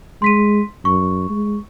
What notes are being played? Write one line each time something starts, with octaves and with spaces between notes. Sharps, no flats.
G#3 C6 B6 D#7
F#2 C#6
G#3